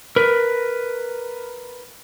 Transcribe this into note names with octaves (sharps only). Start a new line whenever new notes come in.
A#4 B4